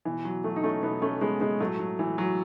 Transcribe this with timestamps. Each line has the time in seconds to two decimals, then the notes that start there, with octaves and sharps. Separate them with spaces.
0.05 B2 E3
0.25 F#3
0.44 F#3 A3
0.56 D#4
0.63 A3 C#4
0.83 B2 B3 D#4
1.02 A3 C#4
1.21 G#3 B3
1.41 G#3 B3
1.60 A2 F#3 A3
1.80 F#3
1.99 E3
2.18 F#3